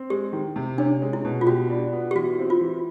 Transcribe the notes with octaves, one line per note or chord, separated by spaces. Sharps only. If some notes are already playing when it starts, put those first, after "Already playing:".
Already playing: C4
G#3 G4
D#3
C3
C#4 D4
G#3
E4
B2
F4
F#4 G4
D4
B3
G4
E3 F#4
C4
F4
E3